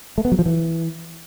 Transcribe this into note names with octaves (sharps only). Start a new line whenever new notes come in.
A3
B3
F#3
F3
E3